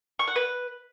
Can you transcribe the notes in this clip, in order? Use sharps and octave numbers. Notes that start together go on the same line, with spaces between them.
C#6
F#5
B4